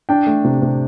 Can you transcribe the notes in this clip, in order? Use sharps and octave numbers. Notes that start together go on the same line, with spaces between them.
D4 G5
A3
C3
C3